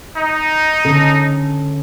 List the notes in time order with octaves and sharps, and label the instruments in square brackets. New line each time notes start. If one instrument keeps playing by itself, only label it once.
[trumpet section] D#4
[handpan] D3 C#4 A4